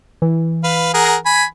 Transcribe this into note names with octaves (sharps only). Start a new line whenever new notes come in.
E3
B4 F5
G#4 A#4 F#5
G#5 B5